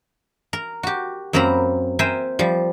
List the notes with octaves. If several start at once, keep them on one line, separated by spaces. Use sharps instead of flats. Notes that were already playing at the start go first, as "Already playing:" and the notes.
A#4
F#4 G4
F#2 A#3 C4 A#4 A#5 B5
A#4 C5 E5 G5 G#5
F3 G3